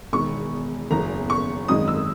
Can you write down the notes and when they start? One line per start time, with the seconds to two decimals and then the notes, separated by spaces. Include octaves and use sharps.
0.13 E1 E2 D#3 C#6
0.91 F#1 E2 B2 A#5
1.30 C#6
1.68 G#1 F#2 D#3 G#3 D#4 D#6
1.88 E6